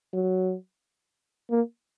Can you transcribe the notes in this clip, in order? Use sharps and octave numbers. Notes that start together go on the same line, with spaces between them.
F#3
A#3